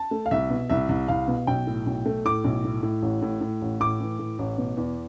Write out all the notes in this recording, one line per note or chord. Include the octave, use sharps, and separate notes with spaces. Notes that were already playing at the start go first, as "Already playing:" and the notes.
Already playing: A5
A3
F5
C2 E5
B2
C2 E5
C2
C2 F5
B2
B1 G5
A2
B1
A3
A2 D6
B1
A2
A2
A1
A2
A2
A1
A2 D6
E3
A2
A1
B2
E2